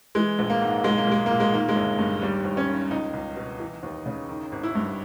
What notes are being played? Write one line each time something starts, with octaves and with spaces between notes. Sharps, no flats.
E3 G#3
A#1
A#3
G#2
B1 G#3
A#3
B1 G#3
A#2 A#3
G#3
D#3 A#3
G#3
G1
G2
D#2 G3
D#2
C#4
D#3
C#2 D#4
C#2
B2
E3
D#2
C#3
D#3
G#1
E4
G2